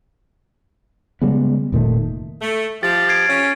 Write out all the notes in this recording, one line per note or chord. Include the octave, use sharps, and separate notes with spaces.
C#3 G3 G#3 B3
F1 A#2 D#3 A3
A3
F3 G4 A6
G#6 C7 D7
C#4